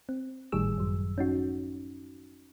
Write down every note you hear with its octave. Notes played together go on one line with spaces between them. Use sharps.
C4
G#1 A2 D#3 G3 G#4 E6
F#2 F#3
C#4 D#4 F#4